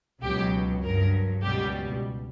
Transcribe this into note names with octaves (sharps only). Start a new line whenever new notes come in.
C#2 B2 F#3 G4
G2 F#3 A#4
C#2 B2 G3 G4